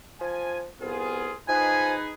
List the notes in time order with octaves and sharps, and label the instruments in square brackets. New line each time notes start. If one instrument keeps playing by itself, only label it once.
[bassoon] F3 [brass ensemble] G#5
[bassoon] C2 [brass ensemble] B3 F4 G#4
[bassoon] F3 [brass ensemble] D#4 G#4 B4 [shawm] G#5